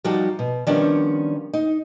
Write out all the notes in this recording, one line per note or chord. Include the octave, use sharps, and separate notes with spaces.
F3 G3 D#4 F#4 G4
B2
D#3 F3 G3 B3 C#4 D4
D#4